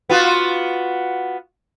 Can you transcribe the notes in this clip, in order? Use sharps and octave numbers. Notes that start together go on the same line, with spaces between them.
B3 F4 F#4